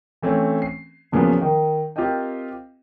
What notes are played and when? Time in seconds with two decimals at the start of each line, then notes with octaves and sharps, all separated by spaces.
0.22 E3 A3 C4 C#4
0.62 C7
1.12 E2 A#2 C#3 F3 F#3 B3
1.42 D#3
1.96 C4 F4 G4 A#4 D#5 G5